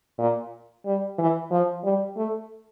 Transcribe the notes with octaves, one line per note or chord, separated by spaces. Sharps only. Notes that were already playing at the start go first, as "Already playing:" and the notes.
A#2
G3
E3
F3
G3
A3